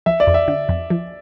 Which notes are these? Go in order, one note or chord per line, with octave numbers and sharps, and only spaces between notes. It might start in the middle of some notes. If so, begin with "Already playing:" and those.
F3 E5
D5
F2
E5
D3
F2
F3